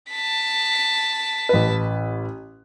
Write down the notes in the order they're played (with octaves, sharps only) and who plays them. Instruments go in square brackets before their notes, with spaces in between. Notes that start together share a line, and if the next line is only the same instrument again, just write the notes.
[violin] A5 B6
[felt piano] A1 B4